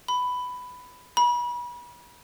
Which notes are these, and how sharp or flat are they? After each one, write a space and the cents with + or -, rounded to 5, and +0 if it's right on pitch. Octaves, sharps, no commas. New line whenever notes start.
B5 +10
B5 -35